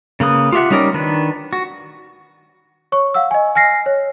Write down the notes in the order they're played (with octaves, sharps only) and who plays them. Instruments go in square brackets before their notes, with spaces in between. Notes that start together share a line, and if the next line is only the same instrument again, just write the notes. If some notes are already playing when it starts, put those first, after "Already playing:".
[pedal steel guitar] C#3 A#3 B4 D#6
F4 G4 E5 F#5
G3 C#4 D#4 A#4 D5
D#3 D4 B4
F#4
[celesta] C#5 C#6
F5 F#5 E6
D#5 G#5
G#5 F6 A#6 C7
C#5